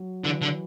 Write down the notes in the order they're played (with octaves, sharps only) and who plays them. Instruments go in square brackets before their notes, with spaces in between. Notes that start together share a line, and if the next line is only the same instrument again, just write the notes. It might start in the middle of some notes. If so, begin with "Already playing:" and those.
Already playing: [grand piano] F#3
[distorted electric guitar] D3 [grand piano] E3
[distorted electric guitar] D3